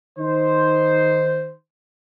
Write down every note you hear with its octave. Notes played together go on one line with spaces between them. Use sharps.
D#3 D#4 C5